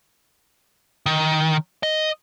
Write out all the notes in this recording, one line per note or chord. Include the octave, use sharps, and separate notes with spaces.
D#3
D#5